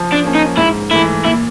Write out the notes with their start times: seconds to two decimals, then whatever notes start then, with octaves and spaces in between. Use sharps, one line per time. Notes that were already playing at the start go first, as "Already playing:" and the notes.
Already playing: F3
0.12 D4
0.24 A#3 C#4
0.35 D#4
0.57 G#2 E4
0.90 E3 A3 E4
1.25 A#2 E4